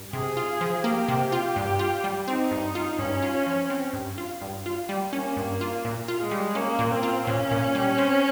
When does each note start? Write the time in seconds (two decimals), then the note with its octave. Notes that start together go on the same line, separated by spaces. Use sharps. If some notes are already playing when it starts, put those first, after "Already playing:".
Already playing: G2
0.13 C3 G#4
0.37 F4
0.61 F3
0.84 A#3 G4
1.08 C3
1.32 F4
1.56 G2
1.79 F4
2.04 G3
2.27 C4 D#4
2.51 G2
2.75 F4
2.99 G2 C#4
3.22 F4
3.46 F3
3.70 C4
3.93 G2
4.18 F4
4.41 G2
4.66 F4
4.89 G3
5.13 A#3 C#4
5.37 G2
5.61 F4
5.85 A#2
6.08 F4
6.20 G#3
6.31 G3
6.55 A#3 C#4
6.79 A#2
6.91 C4
7.03 F4
7.27 A#2 C#4
7.51 A#2
7.75 G3
7.98 C4